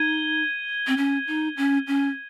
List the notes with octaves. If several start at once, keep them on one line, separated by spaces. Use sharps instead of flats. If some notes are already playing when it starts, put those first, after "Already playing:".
Already playing: D#4 G#6 D#7 G7
C4
C#4
D#4
C#4
C#4